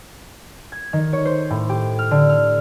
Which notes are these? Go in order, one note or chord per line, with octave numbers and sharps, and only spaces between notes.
G#6
D#3
C#5
C5
A2
G4
F6
D3
F6